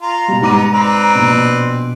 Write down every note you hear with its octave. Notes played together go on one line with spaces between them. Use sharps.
F4 A#5
B2 G3
G#2 B3 D6 D#7
C4 B4 D5
A#1 B2